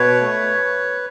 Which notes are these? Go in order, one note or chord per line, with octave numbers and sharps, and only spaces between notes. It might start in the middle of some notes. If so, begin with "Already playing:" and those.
Already playing: B2 B4 C#5
A3